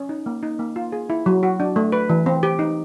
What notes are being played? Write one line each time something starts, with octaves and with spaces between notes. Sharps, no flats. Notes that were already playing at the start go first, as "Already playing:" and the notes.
Already playing: C#4
D#4
A#3
D#4
A#3
F4
G#4
E4
F#3
F#4
D4
A3
B4
E3
C4
G4
D#4